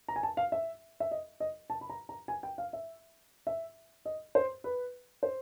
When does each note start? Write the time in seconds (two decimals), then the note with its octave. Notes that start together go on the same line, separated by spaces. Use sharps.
0.08 A#5
0.16 G#5
0.23 A5
0.37 F5
0.52 E5
1.00 E5
1.11 D#5
1.40 D#5
1.70 A5
1.81 B5
1.90 A#5
2.09 A#5
2.28 G#5
2.43 G5
2.58 F5
2.73 E5
3.47 E5
4.05 D#5
4.35 C5
4.64 B4
5.23 C5